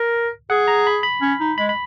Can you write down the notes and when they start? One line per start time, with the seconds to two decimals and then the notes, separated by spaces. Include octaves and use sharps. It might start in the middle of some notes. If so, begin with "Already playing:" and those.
Already playing: A#4
0.50 G#4 F#5
0.68 A#5
0.87 B5
1.03 B5
1.22 C#4
1.40 D#4
1.58 G#3 B5
1.69 B5